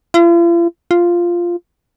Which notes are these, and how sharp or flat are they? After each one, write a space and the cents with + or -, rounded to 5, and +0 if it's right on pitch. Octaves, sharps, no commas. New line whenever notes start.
F4 -45
F4 -5